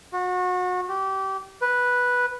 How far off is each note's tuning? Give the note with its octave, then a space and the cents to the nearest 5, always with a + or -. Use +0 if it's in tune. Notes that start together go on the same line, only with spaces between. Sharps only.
F#4 -30
G4 -25
B4 -5